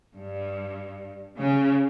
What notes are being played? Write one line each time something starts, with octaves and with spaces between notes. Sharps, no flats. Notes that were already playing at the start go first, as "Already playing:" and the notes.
G2
C#3